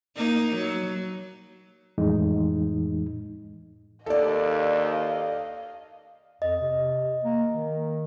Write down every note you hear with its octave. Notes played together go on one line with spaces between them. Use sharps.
A#3 D#4
F#3
F2 A2 E3 G#3 D#4
D#2 A4 D5 D#5 F5
F2 D#5
C3
A#3
D#3